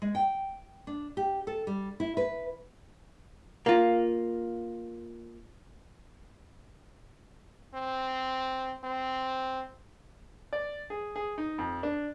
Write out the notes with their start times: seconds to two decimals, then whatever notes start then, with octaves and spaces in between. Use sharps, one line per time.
0.02 G#3
0.15 G5
0.87 D4
1.17 G4
1.47 A4
1.67 G3
2.00 E4
2.17 B4
3.66 A#3 F4
7.74 C4
8.84 C4
10.53 D5
10.90 G#4
11.16 G#4
11.38 D#4
11.58 F2
11.83 D4